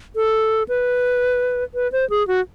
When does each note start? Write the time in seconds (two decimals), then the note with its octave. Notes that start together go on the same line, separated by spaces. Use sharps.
0.16 A4
0.69 B4
1.74 B4
1.92 C5
2.10 G#4
2.28 F#4